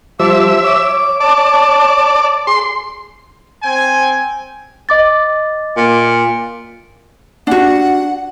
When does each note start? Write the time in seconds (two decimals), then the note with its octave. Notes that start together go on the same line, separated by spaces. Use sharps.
0.20 F3 G3 C5 E5 F5 A5 D6
0.63 C#5 D6
1.20 D5 A5
2.47 G#4 C6
3.63 C4 G5 G#5
4.89 D#5 D6 A6
5.77 A#2
7.47 D4 F#4 F#5